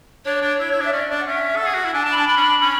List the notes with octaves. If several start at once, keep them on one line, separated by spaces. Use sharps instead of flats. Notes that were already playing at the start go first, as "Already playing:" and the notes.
D4 C#5
D4
E4
E4
D4
E5
C#4 D5
D4 D5
F#5
C#4 E5
A4
F#5
G#4
F#4
E4
D4 G#5
A5
D4
B5
D4 A5
D4 B5
C#4
D4
C#4